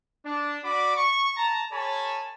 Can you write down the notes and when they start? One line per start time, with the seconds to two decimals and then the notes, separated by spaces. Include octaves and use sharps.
0.25 D4
0.64 F#4 D5 B5 D6
0.96 C#6
1.37 A5 A#5
1.72 G#4 A#4 C#5 G#5 A5 B5